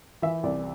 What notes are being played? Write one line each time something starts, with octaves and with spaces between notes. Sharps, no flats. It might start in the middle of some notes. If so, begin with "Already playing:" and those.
E3 E5
C2 D5